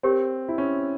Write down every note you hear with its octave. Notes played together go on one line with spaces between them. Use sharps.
C4 G4 A#4 C#5
E4
C#4